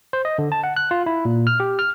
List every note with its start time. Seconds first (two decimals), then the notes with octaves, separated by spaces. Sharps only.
0.13 C5
0.25 D#5
0.38 D3
0.52 A5
0.64 F#5
0.76 F#6
0.91 F4
1.06 E4
1.25 A#2
1.47 F6
1.60 G4
1.79 F6